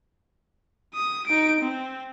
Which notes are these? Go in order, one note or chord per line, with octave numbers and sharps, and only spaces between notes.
D#6
D#4 D7
C4